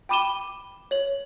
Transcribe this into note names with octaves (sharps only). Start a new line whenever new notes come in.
G5 B5 D6 D#7 E7 G7
C#5 F#7